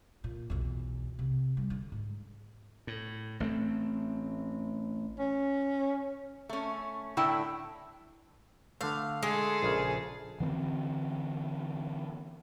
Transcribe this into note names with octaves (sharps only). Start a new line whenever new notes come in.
A#2
B1 E2
C3
G3
D3
G#2
A2
A1 A3 C4
C#4
A3 C#4
A2 D3 A3 E4 G5
D3 A3 F5
G#3 G#4 A4
A#1 C#3
D3 E3 B3 C4